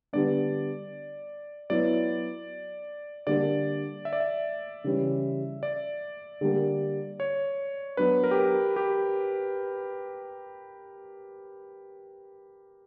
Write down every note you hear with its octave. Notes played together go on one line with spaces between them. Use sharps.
D3 G3 B3 D4 D5
F#3 B3 E4 D5
D3 G3 A#3 D4 D5
E5
D5
E5
C#3 E3 G3 C#4 E4
D5
D3 G3 A#3
C#5
F#3 B3 D4 B4
A#4
G4
A#4
G4